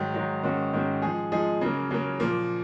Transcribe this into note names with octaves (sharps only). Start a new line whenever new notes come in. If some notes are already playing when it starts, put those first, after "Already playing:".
Already playing: G#2 D#3 F#3
G#2 D#3 F#3
G#2 D#3 A#3 C#4 F#4
G#2 D#3 A#3 C#4 F#4
F3 G#3 D#4 G#4
F3 G#3 D#4 G#4
C#3 F#3 A#3
C#3 F#3 A#3
A#2 F3 A#3